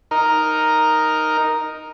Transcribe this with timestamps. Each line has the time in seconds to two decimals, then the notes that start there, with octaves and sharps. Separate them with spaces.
0.11 D#4 A#4